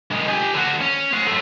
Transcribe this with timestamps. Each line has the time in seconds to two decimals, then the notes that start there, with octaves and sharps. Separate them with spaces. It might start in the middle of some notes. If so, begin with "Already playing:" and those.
0.12 D3 G#3
0.29 G4 G#5
0.54 D3 F#4
0.81 C#4
1.13 C5 F#5
1.27 F#2 A3